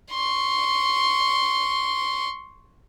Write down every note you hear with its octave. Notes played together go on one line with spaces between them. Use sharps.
C6 C#6